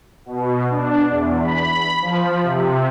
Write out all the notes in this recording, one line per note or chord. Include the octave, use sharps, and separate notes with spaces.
B2
D4
E2
B5
F3
C3